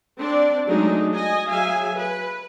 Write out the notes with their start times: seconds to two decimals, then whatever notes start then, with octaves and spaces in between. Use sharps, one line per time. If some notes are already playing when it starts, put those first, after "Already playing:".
0.18 C4 D4 D5
0.66 F#3 G#3 A3 D4 D#4 G#4
1.15 D#5 G#5
1.50 F#3 G#4 E5 F5 G#5
1.96 B4